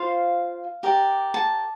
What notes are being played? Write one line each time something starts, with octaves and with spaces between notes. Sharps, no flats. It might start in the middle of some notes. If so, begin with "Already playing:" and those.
Already playing: F4 C5 F5
G4 A#4 D5
A5